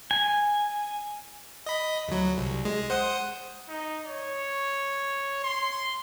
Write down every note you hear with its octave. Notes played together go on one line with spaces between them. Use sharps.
G#5
D#5 B5
D2 F#3
C2
G#3
C5 F#5 D#6
D#4
C#5
C6